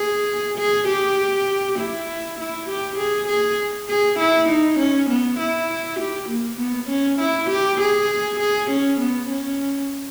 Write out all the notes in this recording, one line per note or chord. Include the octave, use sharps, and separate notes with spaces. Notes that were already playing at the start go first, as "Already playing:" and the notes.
Already playing: G#4
G#4
G4
E4
E4
G4
G#4
G#4
G#4
E4
D#4
C#4
B3
E4
G4
A#3
B3
C#4
E4
G4
G#4
G#4
C#4
B3
C#4